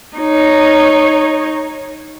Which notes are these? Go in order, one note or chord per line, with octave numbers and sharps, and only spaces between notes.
D#4 C#5